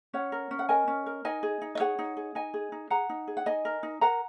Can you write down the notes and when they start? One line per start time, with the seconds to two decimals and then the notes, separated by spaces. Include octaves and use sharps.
0.14 C#4 C#5 F#5
0.32 A#4
0.51 C#4
0.59 F#5
0.69 A#4 D#5 G#5
0.88 C#4
1.06 A#4
1.25 D#4 D#5 G#5
1.43 G#4
1.62 D#4
1.75 D#5
1.80 G#4 C#5 F#5
1.99 D#4
2.17 G#4
2.35 D#4 D#5 G#5
2.54 G#4
2.72 D#4
2.90 G#4 F#5 A#5
3.09 D#4
3.27 G#4
3.37 F#5
3.46 D#4 D#5 G#5
3.65 A#4
3.83 D#4
4.01 A#4 F#5 A#5